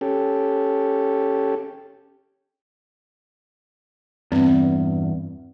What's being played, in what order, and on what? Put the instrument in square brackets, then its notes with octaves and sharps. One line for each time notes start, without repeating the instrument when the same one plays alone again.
[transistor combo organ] C#4 G4 A4
[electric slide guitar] E2 G2 [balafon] C4